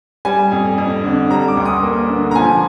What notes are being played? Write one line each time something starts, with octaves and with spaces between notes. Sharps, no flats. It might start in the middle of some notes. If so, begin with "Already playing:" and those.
G3 G#5
F2
F2
D3
G3 A#5
D6
D2
D#6
A#3
D3
A#5
F3 G#5